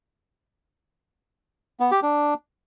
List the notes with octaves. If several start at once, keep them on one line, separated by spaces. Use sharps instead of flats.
B3
G4
D4